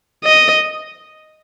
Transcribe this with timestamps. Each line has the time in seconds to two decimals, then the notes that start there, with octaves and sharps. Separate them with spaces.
0.24 D#5